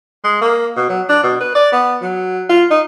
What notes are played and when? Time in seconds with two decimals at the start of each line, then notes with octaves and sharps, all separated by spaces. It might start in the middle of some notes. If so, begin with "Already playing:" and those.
0.24 G#3
0.41 A#3
0.76 B2
0.89 F#3
1.09 D4
1.23 B2
1.41 B4
1.55 D5
1.72 B3
2.01 F#3
2.49 F4
2.71 D#4